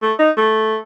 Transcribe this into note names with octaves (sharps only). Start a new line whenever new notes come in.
A3
D#4
A3